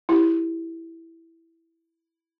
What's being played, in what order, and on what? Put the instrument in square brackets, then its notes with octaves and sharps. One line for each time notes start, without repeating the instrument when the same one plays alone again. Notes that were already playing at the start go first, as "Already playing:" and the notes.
[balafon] E4 G4